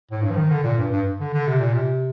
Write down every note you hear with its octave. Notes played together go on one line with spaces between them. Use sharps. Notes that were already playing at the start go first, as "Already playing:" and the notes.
A2
G2
F3
D#3
D3
A#2
G2
G2
D3
D3
C3
A#2
C3